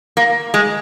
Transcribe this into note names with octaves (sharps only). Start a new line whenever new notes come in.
A#3
G#3